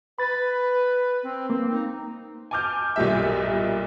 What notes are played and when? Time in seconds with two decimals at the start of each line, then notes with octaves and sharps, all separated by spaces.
0.19 B4 B5 A6
1.23 C4
1.50 A#3 C4
1.70 D#4
2.51 G#5 A5 D6 F6 G6
2.96 B1 A#2 G3 E5